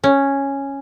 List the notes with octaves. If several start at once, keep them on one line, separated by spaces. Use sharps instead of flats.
C#4